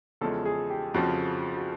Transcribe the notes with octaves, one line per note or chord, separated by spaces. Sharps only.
E2 C#3 F3 G#3 A4
G#4
G4
F2 C#3 F3 F#4
F#4